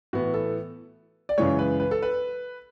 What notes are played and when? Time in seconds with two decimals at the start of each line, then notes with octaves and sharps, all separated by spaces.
0.13 A2 E3 B3 F#4
0.34 A4
1.29 D5
1.38 F#2 C#3 E3 G#3 C#5
1.59 B4
1.80 B4
1.91 A4
2.02 B4